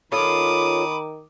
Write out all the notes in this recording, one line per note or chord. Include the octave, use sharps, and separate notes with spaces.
D#3 C#4 F4 A4 B5 D6 D#6